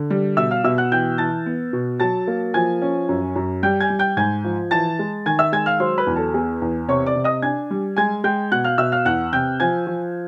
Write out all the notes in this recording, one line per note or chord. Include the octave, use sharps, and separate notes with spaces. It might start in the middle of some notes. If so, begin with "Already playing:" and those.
Already playing: D3
G3
B2 E5 E6
F5 F6
B2 E5 E6
F#5 F#6
E3 G5 G6
E3 A5 A6
B3
B2
F#3 A5 A6
A#3
F3 G#5 G#6
C#4
F#2
F#2
G3 G5 G6
G#5 G#6
G3
G5 G6
G#2 G#5 G#6
F3
E3 A5 A6
G#3
D#3 G#5 G#6
E5 E6
G#3 G#5 G#6
F5 F6
F#3 C5 C6
B4 B5
E2
A4 A5
B3 G#4 G#5
E2
C3 C#5 C#6
D5 D6
C3
D#5 D#6
D4 G#5 G#6
G3
G#3 G#5 G#6
G#3 G5 G6
B2 F#5 F#6
F5 F6
B2 E5 E6
F5 F6
E2 F#5 F#6
C3 G5 G6
F3 G#5 G#6
F3